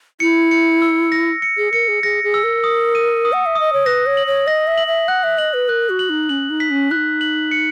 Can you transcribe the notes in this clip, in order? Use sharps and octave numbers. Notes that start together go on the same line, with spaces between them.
E4 C#7
C#7
E6
A#6
C#7
G#4
A#4 C#7
G#4
G#4 A#6
G#4
E6
A#4
D#6
D#7
D#6
F#5
E5
D#5 D#6
C#5
B4 A#6
C#5
F#7
C#5
D#5 A#6
E5
F#7
E5
F#5 F#6
E5
D#5 F#7
B4
A#4 F#6
F#4
F#7
D#4
C#4 F#7
D#4
B6
C#4
D#4 E4 F#6
F#7
C#7